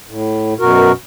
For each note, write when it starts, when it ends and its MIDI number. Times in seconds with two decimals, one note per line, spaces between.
0.07 0.54 45
0.60 0.92 42
0.60 0.92 47
0.60 0.92 66
0.60 0.92 70